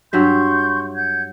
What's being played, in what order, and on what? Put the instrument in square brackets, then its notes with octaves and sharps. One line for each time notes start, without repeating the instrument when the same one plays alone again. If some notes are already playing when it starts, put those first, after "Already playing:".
[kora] G2 F#3 E5 [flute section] C6 C#6 G6
[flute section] F#5 G6 G#6